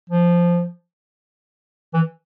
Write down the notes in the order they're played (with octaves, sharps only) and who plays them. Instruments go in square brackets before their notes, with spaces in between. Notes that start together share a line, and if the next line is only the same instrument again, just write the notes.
[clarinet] F3
E3